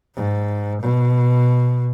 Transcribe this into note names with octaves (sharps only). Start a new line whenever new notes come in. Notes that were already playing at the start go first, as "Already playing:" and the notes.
G#2
B2